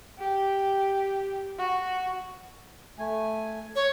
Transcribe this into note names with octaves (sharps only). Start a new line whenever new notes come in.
G4
F#4
A3 G#5
C#5